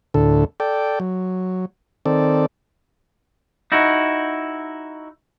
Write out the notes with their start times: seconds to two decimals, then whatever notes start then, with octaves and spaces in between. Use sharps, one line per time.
0.14 D2 A2 D3 A4
0.60 A4 D5 G5
1.00 F#3
2.06 D#3 C4 A4 D5
3.72 D#4 E4 F#4